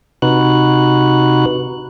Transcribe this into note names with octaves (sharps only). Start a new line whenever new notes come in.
C3 D#4 F#4 B4 F#6